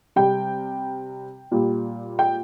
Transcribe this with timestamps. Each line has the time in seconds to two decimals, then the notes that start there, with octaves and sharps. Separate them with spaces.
0.16 C3 G3 G5
1.52 A#2 G3
2.19 G5